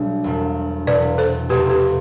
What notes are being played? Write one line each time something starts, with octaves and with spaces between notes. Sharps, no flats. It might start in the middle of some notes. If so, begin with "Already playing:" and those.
Already playing: B1 B2 G3 D4
E1 E2 B2
E1 E2 B2 B4 D5
A4 C5
F1 E2 B2 A3 C4 G4 B4
G4 B4